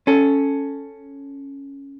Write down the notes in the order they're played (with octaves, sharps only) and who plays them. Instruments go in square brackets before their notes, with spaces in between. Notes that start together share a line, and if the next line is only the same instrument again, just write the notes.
[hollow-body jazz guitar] C#4 A4